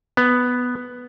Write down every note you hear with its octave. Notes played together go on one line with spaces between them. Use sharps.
B3